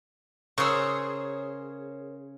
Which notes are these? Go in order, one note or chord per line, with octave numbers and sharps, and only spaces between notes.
C#3 G#4 A#4 C5 C#5 C#6 E6